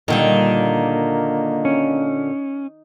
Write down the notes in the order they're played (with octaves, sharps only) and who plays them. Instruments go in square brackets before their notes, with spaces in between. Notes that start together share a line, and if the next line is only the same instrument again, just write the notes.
[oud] A#2 D3 G3 [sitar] D#3 [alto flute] A#3
[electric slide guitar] C#4